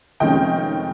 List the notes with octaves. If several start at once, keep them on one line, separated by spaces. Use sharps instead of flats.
F1 F2 D#3 G#3 C#4 D#5 G5